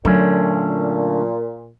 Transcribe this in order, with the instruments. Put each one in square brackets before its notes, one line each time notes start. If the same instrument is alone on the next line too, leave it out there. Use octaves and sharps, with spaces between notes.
[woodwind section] A#2 [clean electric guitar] D3 A3 C#4 [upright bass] F#3